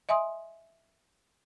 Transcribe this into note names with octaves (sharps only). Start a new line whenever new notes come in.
D#5 E5 G#5 C6 D#6